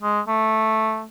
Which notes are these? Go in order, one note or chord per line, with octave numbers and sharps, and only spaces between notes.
G#3
A3